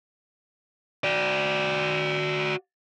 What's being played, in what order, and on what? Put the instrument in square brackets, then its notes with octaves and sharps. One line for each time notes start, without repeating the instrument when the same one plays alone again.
[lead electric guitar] F#4 D5